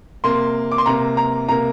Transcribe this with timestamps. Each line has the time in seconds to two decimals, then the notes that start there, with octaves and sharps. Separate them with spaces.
0.24 C3 A#3 C6
0.72 D6
0.78 C6
0.86 C3 A#3 A#5
1.17 A#5
1.49 C3 A#3 A#5